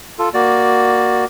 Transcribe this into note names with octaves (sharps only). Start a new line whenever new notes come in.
F4 A4
A#3 F#4 D5